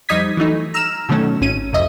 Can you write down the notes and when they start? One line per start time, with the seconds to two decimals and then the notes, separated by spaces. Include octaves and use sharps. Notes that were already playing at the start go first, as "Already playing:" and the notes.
0.09 F2 G3 D#4 D#6 G#6 B6
0.37 E3 F#3 A3 D#4
0.74 A#5 E6 F6 E7
1.09 B2 D3 D#3 F#3 A3 C#4
1.41 G#1 C#4 D#7
1.73 C2 F2 D#5 E5